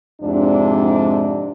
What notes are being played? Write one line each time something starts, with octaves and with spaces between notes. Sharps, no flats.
F2 G#2 C3 D4